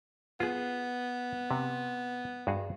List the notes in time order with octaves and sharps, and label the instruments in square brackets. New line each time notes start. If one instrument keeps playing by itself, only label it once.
[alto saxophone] B3 [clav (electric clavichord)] F4 G#4
[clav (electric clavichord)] C3
G2 F#4 G#4